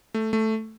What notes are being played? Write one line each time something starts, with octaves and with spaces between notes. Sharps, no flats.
A3
A3